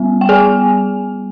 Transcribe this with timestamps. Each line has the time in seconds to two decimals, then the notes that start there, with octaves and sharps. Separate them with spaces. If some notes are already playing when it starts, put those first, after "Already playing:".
Already playing: G3 B3
0.21 G5
0.29 G#4 G#5